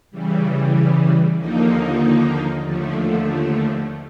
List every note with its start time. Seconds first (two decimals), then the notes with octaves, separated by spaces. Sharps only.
0.11 C#3 E3 G3
1.38 D#2 D3 F3 A#3 D#4
2.63 D#2 D3 F3 A3